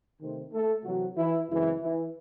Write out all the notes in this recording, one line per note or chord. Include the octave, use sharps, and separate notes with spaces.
C3 D#3 A3 C4
A3 A4
C3 E3 F#3 C4 F#4
E3 E4
F#2 C#3 E3 G#3 C4 E4
E3 E4